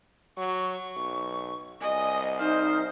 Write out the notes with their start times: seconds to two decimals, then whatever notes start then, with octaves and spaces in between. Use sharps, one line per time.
0.37 F#3 C#6
0.96 B1
1.82 C2 D#5 G#5
2.39 D#4 C5 F6